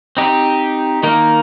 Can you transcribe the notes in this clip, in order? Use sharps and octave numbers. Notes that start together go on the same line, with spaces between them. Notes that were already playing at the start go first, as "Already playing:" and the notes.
C4 D#4 G4
D#3 A#3 D#4 A#4